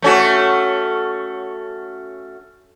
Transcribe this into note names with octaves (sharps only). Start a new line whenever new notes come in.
A3 C#4 F#4